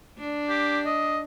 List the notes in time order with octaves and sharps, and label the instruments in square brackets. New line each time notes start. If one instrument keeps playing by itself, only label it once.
[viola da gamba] D4
[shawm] G4
D#5